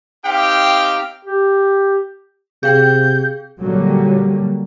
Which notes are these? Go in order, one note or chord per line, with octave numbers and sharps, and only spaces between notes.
C4 D#4 G4 F5 G5
G4
C3 G#4 F5 G5 G6
A#2 D3 F#3 G3 A#3